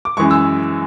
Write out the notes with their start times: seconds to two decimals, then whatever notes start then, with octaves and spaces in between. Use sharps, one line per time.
0.05 D6
0.17 F#2 E3 G#3 C#6
0.31 E6